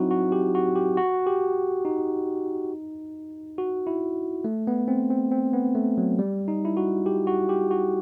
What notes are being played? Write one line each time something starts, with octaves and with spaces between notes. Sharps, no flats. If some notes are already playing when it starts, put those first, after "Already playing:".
Already playing: F#3 C4 D#4 E4 F#4
F#4
G4
F#4
G4
F#4
G4
D#4
F#4
E4
A3
B3
C4
C4
C4
B3
A3
F#3
G3
D#4
E4
F#4
G4
F#4
G4
F#4